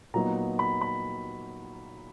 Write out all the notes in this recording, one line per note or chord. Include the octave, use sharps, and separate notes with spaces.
A#2 F#3 B3 D#4 A#5
B5
B5